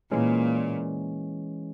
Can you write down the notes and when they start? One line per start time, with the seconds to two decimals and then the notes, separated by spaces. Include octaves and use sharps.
0.11 A#2 E3 G#3 C#4